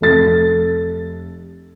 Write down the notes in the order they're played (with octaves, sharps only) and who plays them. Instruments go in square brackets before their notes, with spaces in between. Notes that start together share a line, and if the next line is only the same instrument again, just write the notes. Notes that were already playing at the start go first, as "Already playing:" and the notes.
[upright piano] F1 A4 A6